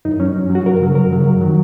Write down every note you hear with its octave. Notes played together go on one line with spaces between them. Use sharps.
F#2 D#4
F#3 C#4
F#2
C#4
F#3
F#4
F#2 A#4
C#3 F#3
F#2 A#4
C#3 F#3
F#2
D#3 F#3